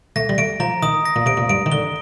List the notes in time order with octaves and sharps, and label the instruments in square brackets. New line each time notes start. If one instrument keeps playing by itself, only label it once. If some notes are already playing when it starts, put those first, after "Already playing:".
[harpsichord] A3 [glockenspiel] A#6
[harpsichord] G3
[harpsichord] A3 [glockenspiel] D7
[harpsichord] F3 [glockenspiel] A#5
[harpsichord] D#3 [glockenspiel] D#6
[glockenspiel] A#6
[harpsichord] A#2
[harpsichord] C3 [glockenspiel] D7
[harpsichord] A#2
[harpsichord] G2 [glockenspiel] D7
[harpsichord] D#3
[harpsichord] D3 [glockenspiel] G7